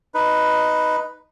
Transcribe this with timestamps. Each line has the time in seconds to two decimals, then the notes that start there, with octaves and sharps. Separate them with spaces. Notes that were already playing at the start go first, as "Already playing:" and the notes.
0.14 D#4 B4